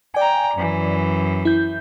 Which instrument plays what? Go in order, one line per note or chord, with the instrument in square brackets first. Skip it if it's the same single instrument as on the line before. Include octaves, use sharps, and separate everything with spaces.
[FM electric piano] D5 G#5 [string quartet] G5 A#5
[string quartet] F#2 E3
[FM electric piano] E4 G6